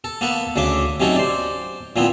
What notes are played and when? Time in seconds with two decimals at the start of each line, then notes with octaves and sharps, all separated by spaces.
0.04 A4
0.21 A#3 B3 A4 B4
0.56 D2 C#3 A3 E5 D6
1.00 C3 F#3 C#4 D#4 A4
1.16 C5 D5
1.96 A#2 F3 B3 C4 E4